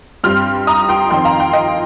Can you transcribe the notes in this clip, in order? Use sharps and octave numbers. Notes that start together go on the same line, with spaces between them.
G2 G3 C4 C6 F6
A#5 D#6
G5 C6
F2 D#3 C4 G5 C6
F5 A#5
G5 C6
D#5 G5